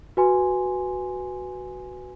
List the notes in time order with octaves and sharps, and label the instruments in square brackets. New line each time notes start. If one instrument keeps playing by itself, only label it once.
[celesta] F#4 B4 G#5 C6